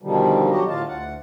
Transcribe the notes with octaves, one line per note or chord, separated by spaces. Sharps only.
B2 D3 D#3 F3 G3
F#3 F#4 G4 D#5
A2 D3 F4 F5 A5
D2 F#5